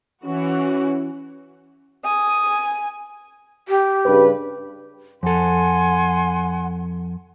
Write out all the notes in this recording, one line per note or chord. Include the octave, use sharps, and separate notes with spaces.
E3 C#4 F#4
G#5 D#6
G4
G2 C#3 B4
F2 A4 F#5 G#5 C6